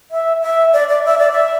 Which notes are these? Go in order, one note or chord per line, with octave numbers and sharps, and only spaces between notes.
E5
E5
D5
D5
E5
D5
E5